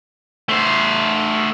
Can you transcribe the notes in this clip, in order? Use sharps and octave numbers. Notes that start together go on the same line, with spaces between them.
A3 C5